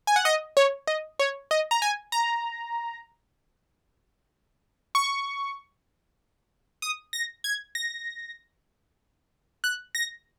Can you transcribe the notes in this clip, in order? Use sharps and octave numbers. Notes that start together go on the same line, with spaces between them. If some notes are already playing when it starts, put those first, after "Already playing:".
G#5
F#5
D#5
C#5
D#5
C#5
D#5
A#5
G#5
A#5
C#6
D#6
A#6
G#6
A#6
F#6
A#6